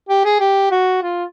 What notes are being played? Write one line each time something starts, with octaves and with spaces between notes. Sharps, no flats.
G4
G#4
G4
F#4
F4